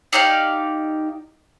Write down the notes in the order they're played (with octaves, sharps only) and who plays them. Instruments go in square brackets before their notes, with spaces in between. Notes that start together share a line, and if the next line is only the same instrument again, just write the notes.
[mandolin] D#4 G4 D5 F5